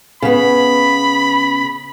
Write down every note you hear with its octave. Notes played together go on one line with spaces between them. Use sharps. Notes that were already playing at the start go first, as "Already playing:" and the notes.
C#3 B3 B5